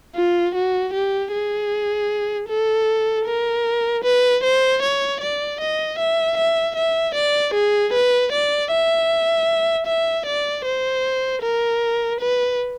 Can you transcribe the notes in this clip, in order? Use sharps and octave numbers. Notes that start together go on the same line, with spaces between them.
F4
F#4
G4
G#4
A4
A#4
B4
C5
C#5
D5
D#5
E5
E5
E5
D5
G#4
B4
D5
E5
E5
D5
C5
A#4
B4